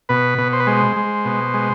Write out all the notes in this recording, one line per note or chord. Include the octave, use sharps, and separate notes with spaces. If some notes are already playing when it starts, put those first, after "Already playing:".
B2 B4
B2
C5
B4
G#3 C5
G#3
B2
G#3